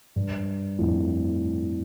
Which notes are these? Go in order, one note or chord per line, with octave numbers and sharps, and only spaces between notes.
G2
F2 A2